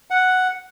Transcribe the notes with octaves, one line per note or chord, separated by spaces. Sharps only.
F#5